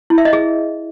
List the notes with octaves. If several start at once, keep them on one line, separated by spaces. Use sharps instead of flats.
E4
E5
D#5
G#4